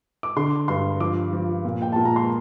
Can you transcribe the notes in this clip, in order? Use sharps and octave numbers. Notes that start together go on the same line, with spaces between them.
D6
D3 C6
G2 C6
F3 D6
F3
A#2
G5
A#2 A5
A#5
C6